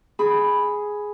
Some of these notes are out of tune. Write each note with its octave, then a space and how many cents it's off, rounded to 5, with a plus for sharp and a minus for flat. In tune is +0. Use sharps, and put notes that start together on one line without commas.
G#4 +5 B5 +0